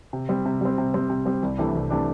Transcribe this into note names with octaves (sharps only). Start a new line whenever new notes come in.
C3
G3 C4
C3
G3 C4
C3
G3 C4
C3
G3 C4
C2
C3 E3 A3 D4
C2
C3 E3 A3 D4